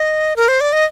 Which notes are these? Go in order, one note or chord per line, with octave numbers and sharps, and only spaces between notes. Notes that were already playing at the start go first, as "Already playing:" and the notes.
Already playing: D#5
A#4
C5
D5
D#5